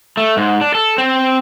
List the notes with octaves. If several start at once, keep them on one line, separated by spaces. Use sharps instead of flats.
A3
G#2
D4
A4
C4